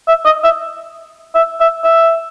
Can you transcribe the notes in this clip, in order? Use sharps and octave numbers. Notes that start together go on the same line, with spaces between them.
E5
D#5
E5
E5
E5
E5